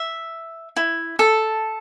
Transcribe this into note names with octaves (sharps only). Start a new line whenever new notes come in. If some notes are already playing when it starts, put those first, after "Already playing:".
Already playing: E5
E4
A4